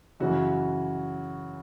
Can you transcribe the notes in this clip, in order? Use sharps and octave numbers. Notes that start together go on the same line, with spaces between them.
F#2 C#3 E3 F#4